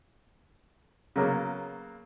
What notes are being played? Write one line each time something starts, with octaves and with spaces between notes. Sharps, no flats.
C#3 F#3 A#3 B3